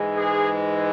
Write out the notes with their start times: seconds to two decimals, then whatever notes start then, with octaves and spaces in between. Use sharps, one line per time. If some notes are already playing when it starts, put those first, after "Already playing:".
Already playing: G#2 E3 G#3
0.16 G#4